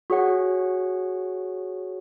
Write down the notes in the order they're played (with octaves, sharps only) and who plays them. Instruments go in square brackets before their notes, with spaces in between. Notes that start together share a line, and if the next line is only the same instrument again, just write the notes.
[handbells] F#4 G#4 C#5 F#5